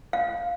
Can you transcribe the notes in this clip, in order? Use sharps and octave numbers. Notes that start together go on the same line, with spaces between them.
F5